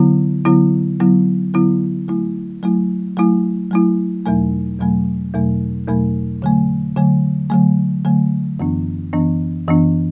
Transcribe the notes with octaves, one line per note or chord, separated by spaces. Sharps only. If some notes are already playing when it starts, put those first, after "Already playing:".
Already playing: D3 F#3 B3 E4
D3 F#3 B3 E4
D3 F#3 B3 E4
D3 F#3 B3 E4
F#3 A3 E4
F#3 A3 E4
F#3 A3 E4
F#3 A3 E4
E2 B2 F#3 A3
E2 B2 F#3 A3
E2 B2 F#3 A3
E2 B2 F#3 A3
D3 F#3 A3
D3 F#3 A3
D3 F#3 A3
D3 F#3 A3
F#2 E3 B3 D4
F#2 E3 B3 D4
F#2 E3 B3 D4